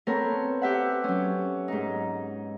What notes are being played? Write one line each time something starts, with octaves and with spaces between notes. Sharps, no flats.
B3 C4 A4 A#4 C#5
G4 E5 F#5
F#3 C#4
G#2 D#4